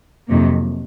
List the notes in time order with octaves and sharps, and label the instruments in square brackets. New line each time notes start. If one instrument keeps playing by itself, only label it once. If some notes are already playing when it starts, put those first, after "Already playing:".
[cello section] F2 C3 D#3 F#3 A#3